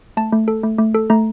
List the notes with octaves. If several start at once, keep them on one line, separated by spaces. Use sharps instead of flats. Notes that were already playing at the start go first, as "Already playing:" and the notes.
A3 A5
A3
A4
A3
A3
A4
A3 A#5